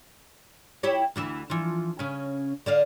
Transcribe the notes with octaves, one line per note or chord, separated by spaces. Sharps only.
E4 G4 C#5
D2 E3 E5
E3 F3
C#3 C#4
D3 D5 F5